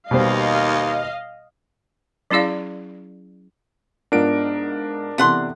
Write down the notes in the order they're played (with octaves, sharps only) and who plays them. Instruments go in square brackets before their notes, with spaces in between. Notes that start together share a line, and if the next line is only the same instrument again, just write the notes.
[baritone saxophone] D#2 [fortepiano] B2 G3 C5 [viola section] D#5 F5
[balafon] F#3 C#4 E4 G#4 D5 F5
[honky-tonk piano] G#2 B3 F4 [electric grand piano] D4 A#4 D7
[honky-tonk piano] C3 E3 B3 [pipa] A3 F#5 C6